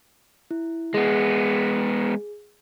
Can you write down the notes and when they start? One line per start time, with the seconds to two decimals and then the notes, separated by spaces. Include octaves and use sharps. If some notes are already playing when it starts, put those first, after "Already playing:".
0.51 E4
0.94 G#3 B3 G#4